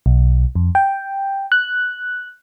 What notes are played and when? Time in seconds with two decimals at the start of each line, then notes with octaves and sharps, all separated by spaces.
0.06 B1
0.55 F2
0.75 G5
1.52 F#6